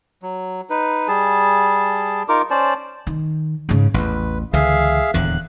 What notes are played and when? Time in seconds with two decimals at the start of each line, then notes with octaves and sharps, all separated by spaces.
0.22 F#3
0.70 D#4 B4
1.08 G3 G#4 A5
2.29 D#4 F4 A#4 D6
2.50 C#4 C5 D5 A5
3.07 D#3
3.69 G#2 C#3
3.94 A1 E2 B4
4.53 C#2 D3 E3 G#4 E5 F5
5.14 D#1 E2 D3 F#6